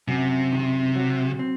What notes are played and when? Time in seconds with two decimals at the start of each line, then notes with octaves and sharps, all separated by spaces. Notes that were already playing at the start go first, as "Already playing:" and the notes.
0.08 F#2 C3
0.52 D#3
0.95 F#3
1.39 C4